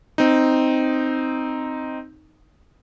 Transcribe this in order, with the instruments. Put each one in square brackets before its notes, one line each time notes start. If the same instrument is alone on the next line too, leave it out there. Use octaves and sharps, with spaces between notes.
[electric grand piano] C4 D#4